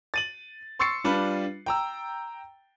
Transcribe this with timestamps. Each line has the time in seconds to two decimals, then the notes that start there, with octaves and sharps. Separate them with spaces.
0.14 A6 D#7 F#7
0.79 C6 C#6 E6 A6 C7 C#7
1.04 G3 D4 F4 B4
1.66 G5 A#5 E6